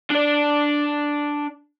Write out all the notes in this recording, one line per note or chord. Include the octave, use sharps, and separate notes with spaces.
D4 D5